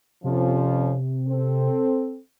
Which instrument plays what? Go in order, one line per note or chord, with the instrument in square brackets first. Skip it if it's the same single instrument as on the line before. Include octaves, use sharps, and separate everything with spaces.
[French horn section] F2 F3 C#4 [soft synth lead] C3
[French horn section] C4 A4